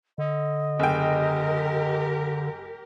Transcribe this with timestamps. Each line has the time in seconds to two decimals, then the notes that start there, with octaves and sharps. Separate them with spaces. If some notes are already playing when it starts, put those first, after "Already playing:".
0.18 D3 D#5
0.80 F#1 G4 A#4 G5